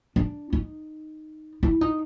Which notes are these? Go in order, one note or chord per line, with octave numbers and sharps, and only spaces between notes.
D4
D#4
E4
D#4